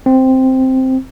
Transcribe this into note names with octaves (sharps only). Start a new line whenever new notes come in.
C4